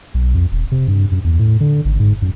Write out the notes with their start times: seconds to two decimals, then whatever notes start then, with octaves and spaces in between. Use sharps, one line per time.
0.14 B1
0.34 F2
0.52 D#1
0.72 C3
0.88 G2
1.11 F#2
1.24 E2
1.39 A2
1.60 D3
1.85 G#1
2.00 G#2
2.22 F#2